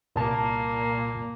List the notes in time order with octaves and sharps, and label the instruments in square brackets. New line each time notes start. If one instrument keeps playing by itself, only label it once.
[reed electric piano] C2 A5 [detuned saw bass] A#2 [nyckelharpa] A#3